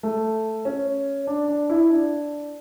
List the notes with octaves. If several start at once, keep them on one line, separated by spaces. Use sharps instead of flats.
A3
C#4
D4
D4
E4
D4